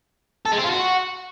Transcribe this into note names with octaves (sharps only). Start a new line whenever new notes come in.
A4
G#3
C4
F4
F#4